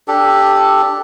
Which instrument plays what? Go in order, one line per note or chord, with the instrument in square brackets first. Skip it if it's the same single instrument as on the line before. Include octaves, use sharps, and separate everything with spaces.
[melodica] D4 G4 A4